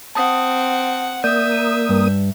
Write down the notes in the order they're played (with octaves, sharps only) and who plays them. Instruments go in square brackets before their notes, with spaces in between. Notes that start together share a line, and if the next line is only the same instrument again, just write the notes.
[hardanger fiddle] C4 F#5 [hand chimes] A5 D#6
[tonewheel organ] A#3 D#6 [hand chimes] D5 G6 [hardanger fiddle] E5
[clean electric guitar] G2